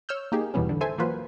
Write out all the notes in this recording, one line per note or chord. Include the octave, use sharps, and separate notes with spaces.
C#5 E6 F6 G6
A#3 D#4 G4 G#4
E2 B2 E3 G3 B3 C#4
G#1 D3 E3
A4 C5 E5 G#5 A5
E3 F#3 A#3 F4 B4 C5